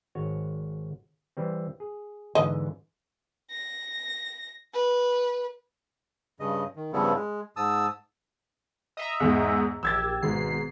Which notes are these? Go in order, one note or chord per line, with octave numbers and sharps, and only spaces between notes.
G#1 F#4 C#5
E3 G3 C4
G#4
G#2 D3 E3 D#5
A#6
B4
G2 C#3 D#5
D#3
G2 C#3 F3 G3 B3 E4
G#3
G#2 A5 D#6 E6
D#5 E5 A#5
E2 G#2
A#1 G4 E6 G#6 A6
G#1 G#2 B2 C7